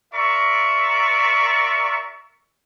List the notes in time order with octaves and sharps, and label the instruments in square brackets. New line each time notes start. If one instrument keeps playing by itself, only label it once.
[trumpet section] F4 A#4 D5 E5 A#5 C#6